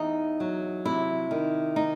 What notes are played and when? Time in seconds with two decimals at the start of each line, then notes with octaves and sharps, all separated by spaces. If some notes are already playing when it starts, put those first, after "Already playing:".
Already playing: E2 D#4
0.40 F#3
0.85 C3 E4
1.31 D#3
1.76 D#4